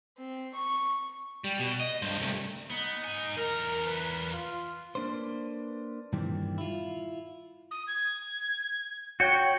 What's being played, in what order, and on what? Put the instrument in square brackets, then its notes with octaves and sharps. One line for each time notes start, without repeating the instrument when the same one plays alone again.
[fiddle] C4
C#6
[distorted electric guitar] G3
B2
D#5
G2 C5
C2 A3
[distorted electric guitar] B3 [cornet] D#4
[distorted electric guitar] G#2 G#5
[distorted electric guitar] E2 A#5 [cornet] A#4
[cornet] B4
F4
[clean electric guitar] A#3 D4 B4 C5
G2 A#2 D#3 E3 G3 C4
E4 F4
[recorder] D#6
G#6
[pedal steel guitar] F#4 C#5 G5